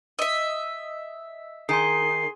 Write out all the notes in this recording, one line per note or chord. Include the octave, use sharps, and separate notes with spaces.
D#5 E5 E6
D#3 G#4 G#5 C6 C7